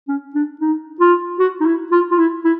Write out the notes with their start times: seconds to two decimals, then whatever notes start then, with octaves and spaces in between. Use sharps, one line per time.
0.08 C#4
0.35 D4
0.61 D#4
1.00 F4
1.39 F#4
1.61 D#4
1.66 E4
1.92 F4
2.11 F4
2.18 E4
2.44 E4